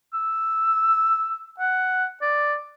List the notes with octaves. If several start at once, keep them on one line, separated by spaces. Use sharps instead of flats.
E6
F#5
D5